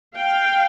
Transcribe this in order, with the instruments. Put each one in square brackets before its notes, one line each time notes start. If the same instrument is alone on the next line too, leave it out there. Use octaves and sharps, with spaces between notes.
[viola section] F5 G5